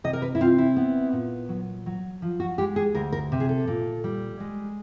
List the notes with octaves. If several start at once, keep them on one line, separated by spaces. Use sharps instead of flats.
C3 D#5
A#4
B4
E4
C4 F4
E4
B3
A#2
F#3
F#3
F3
F#4
G#3 G4
G#4
D2 A#4
A#4
C3
G#4
A4
A#2
G3
G#3